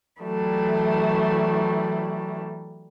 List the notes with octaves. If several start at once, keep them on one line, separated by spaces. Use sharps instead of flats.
E3 F#3 G3 A3